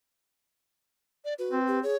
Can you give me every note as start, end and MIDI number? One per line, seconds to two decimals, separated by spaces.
1.25 1.34 74
1.39 1.59 66
1.39 1.81 71
1.52 1.80 60
1.67 1.81 67
1.83 1.95 68
1.83 1.97 73